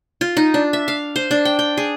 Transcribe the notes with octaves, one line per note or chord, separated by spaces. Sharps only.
F4
D#4
D4
E5
F5
C5
D4
G5
G5
G#4